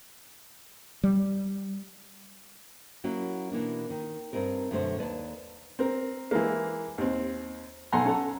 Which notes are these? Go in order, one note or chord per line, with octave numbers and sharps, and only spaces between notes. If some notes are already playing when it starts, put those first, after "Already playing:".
G3
F#3 A#3 C#4 E4 F#4
B2 E3 A#3 D4
D#3
G2 C4 D#4 A#4
F#2 B2 D3 A3 B3 C5
D#2 B4 D5 A5
C4 A#4
E3 G#3 A#3
D#2 C4
B1 A4 F#5 G#5 A#5 C6
C#4 A4 F#5 A5 A#5